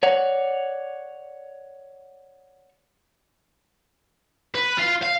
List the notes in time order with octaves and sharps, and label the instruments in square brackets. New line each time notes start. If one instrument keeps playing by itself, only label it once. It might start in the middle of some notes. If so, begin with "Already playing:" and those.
[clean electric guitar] C#5 D5 F#5
[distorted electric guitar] B4
F4 F5
F5